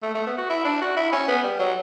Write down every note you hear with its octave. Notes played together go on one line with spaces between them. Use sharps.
A3
A3
B3
F#4
E4
D4
F#4
E4
C#4
B3
G3
F#3